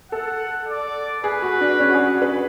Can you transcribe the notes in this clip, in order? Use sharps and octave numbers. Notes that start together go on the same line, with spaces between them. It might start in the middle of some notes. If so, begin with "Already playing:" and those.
A4 F#5
D5
G#4 B4
F#4
D4
C#4
F#4
G#4
B4